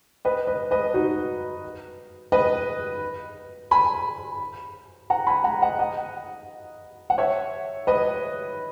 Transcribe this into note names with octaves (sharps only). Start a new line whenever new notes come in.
B4 D#5
B4 D#5
B4 D#5
D#4 F#4
B4 D#5
G#5 B5
F#5 A#5
G#5 B5
F#5 A#5
D#5 F#5
D#5 F#5
F#5
C#5 E5
B4 D#5